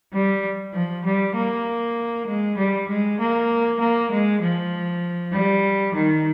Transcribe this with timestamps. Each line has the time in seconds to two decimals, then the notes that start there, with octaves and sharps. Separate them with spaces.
0.13 G3
0.74 F3
1.05 G3
1.35 A#3
2.27 G#3
2.58 G3
2.89 G#3
3.20 A#3
3.80 A#3
4.11 G#3
4.41 F3
5.33 G3
5.95 D#3